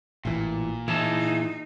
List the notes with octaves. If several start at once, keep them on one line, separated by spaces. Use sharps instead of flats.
A1 A#2 E3
E3 D#4 E4 G#4 A5